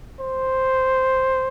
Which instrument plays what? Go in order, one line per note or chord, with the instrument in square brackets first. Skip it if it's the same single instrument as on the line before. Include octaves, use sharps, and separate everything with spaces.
[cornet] C5